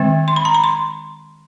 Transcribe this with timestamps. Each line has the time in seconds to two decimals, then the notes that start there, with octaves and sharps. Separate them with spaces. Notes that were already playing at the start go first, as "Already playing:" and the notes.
Already playing: D#3 G#3 C4
0.28 C6
0.36 B5
0.45 A#5
0.54 B5
0.64 C6